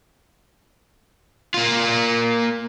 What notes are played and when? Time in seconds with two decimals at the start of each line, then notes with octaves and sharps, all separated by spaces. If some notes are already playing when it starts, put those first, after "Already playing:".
1.54 A#3 F4